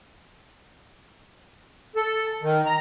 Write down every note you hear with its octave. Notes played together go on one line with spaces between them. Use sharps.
A4
D#3
A#5